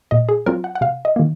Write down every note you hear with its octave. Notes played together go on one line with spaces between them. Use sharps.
A#2 D#5
G#4
F#3 C4 F4 A#4
F#5
F#5
C3 F5
D#5
D#3 A#3